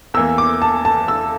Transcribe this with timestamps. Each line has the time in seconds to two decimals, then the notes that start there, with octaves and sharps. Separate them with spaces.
0.14 E2 E3 A#3 E6
0.38 D6
0.62 A5
0.85 A5
1.08 E6